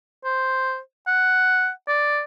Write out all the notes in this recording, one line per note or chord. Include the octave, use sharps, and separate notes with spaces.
C5
F#5
D5